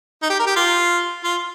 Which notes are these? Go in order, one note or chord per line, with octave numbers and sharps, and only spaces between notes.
D#4
G4
A#4
G4
F4
F4